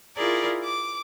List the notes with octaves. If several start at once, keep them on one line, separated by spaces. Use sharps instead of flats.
E4 F4 G#4 A#4 D5
D6